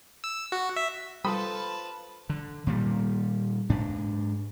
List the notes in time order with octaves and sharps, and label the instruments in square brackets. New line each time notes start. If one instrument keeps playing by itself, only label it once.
[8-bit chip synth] E6
F#4
E5
[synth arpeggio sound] G3 B5 D#6 [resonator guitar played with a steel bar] F4 A4 C5 [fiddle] B4 A5
[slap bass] D3
A#2 D#3 G3
G#2 D4